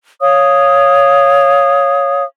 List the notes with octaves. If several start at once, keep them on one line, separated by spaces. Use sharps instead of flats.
C#5 F5 D#6